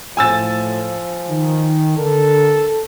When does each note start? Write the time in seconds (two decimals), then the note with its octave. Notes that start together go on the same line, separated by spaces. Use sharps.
0.17 A2 F3 G#5 E6 A6
1.29 D#3
1.97 D3 A4 A#4